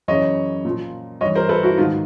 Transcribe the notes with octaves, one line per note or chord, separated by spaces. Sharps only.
F#2 C#3 E3 C#5 D#5
A#2 F3
G2 E3 C#5 D#5
A#4 C5
A4 B4
E4 F#4
G#2 D#3 F#3 D#4 F4